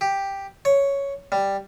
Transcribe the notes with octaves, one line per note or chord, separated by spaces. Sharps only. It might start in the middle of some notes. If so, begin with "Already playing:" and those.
G4
C#5
G3